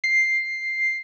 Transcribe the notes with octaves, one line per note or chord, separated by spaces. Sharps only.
C7